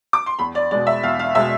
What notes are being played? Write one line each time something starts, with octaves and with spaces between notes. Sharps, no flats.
D6
C6
E2 B5
D5
B2 G#3 D5
E5
E2 F5
F5
B2 G#3 E5